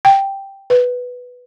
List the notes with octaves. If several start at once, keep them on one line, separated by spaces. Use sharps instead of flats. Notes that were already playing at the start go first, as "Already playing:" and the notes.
G5
B4